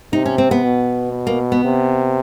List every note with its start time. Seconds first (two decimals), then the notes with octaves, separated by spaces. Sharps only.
0.13 C3 D#4
0.26 C#4
0.38 C4
0.51 B3
0.64 B2
1.27 A#3
1.52 B3
1.64 C3